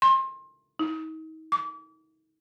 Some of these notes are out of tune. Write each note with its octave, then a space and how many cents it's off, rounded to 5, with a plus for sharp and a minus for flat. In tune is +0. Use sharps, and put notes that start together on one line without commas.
C6 +30
D#4 +35
D6 -35